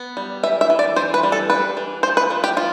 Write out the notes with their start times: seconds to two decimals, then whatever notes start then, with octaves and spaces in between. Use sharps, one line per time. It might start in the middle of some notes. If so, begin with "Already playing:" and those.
Already playing: B3
0.17 G3
0.43 E3 E5
0.61 E5
0.70 E3
0.79 D5
0.96 E3 C5
1.14 B4
1.23 G3
1.32 A4
1.50 D4 B4
1.77 E3
2.03 F3 C5
2.17 B4
2.30 F3
2.44 G4
2.57 F3 F4